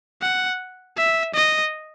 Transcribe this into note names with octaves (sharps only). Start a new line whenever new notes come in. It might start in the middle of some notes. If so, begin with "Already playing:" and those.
F#5
E5
D#5